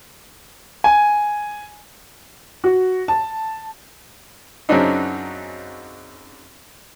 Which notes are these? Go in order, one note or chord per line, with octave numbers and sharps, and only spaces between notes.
G#5
F#4
A5
F#2 C#3 F#3 C4 D4 D#4